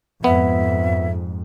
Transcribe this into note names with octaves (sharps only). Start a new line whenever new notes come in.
F2 G#2 B3 E5